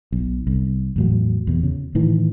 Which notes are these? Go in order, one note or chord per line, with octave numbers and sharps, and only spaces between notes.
B1
C2
E2 A2 F#3
E2 B2
C#3
A2 D#3 E3